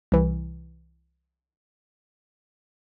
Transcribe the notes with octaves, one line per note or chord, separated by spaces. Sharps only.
C2 E3